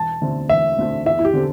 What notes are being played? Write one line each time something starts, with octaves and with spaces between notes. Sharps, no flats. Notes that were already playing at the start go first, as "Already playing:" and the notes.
Already playing: E1 A5
D2 D3 A3 C4
E1 E5
D2 D3 A3 C4
E2 E5
E4
G4
D3 C4 A4